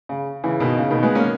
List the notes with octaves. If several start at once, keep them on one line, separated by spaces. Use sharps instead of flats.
C#3
C#3 E3
B2 D#3
C#3
B2 D#3
G#3 B3
A#3 C#4